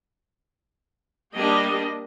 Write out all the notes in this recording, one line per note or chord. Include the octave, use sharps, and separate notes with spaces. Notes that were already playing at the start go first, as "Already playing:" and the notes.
G3 A#3 D4 G4 D#5